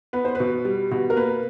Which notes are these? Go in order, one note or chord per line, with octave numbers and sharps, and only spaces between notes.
B3 B4
C5
B2 B4
G3
B2
A#4
A#3 B4